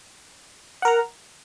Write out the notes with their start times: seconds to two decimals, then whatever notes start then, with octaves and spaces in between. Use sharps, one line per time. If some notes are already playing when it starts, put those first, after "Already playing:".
0.82 F#5
0.85 A#4
0.88 A#5